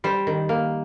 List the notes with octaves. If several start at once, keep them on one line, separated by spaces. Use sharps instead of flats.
G3 C5
D#3
A#3